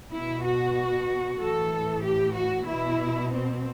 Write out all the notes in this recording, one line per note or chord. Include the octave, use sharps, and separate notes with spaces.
B2 E4
F#4
A2 E3 A4
G4
F#4
B2 E4
C4